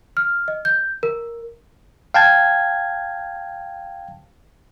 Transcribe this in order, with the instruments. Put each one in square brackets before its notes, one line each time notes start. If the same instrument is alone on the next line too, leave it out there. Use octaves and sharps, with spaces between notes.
[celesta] F6
D#5
G6
A#4
[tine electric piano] F5 G5 A5 G#6